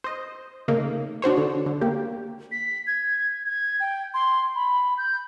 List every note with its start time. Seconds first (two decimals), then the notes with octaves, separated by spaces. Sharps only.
0.04 C5 D#5
0.68 C#3 A3 A#3 D#4
1.22 D4 F#4 C5 C#5
1.37 D3
1.66 D3
1.81 A#3 G4
2.52 B6
2.87 G#6
3.46 G#6
3.80 G5
4.14 C6
4.55 B5
4.98 G6